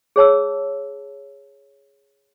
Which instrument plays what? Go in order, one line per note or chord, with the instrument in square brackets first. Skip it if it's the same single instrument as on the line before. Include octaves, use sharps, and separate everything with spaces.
[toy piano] G#4 C#5 A5 E6